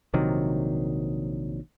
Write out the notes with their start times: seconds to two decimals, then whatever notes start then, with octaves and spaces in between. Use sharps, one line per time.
0.14 A#1 C3 D#3 F#3